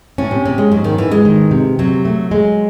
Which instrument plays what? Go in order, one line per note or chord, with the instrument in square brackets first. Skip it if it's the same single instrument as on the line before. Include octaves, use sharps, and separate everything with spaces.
[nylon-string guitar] A2 [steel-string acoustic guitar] C#4
[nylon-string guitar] C3
[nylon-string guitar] C3 [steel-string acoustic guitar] C#4
[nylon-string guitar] G#3
[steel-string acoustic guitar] G#2 [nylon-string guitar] F#3
[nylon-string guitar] D#3
[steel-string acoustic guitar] G#2 [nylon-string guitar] E3
[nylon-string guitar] G#3
[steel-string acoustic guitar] D#3
C3
[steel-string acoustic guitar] C3 [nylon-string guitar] F#3
[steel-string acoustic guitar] A3
G#3